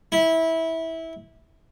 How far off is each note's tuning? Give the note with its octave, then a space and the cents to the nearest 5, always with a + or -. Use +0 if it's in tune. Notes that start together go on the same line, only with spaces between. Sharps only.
E4 -20